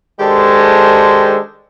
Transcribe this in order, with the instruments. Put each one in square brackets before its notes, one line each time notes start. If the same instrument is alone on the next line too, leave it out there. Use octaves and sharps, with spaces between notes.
[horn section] D#3 G#3 D4 G4 A4 C5